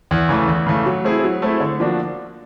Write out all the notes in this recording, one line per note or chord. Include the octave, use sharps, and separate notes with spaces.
E2
C#3 E3 A3
E2
C#3 E3 A3
F#3
A3 C4 E4 G#4
F#3
A3 C4 E4 G#4
D3
F3 A#3 D4 F#4